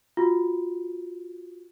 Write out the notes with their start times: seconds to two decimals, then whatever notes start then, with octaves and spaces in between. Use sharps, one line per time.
0.17 F4 F#4